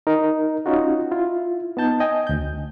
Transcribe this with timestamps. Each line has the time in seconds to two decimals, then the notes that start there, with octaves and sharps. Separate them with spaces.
0.07 D#4 A#4
0.66 C#4 D#4 F4 F#4
1.11 E4 F4
1.77 B3 D#4 A5 G6
2.00 D#5 G5 G#5
2.27 D2 G6